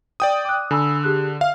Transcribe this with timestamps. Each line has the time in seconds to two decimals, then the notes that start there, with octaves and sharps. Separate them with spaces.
0.20 D5 G5 D#6
0.45 D6 F#6
0.71 D3 G#5 B5 E6
1.04 G4 G#4 F#6
1.41 E5 F5 F6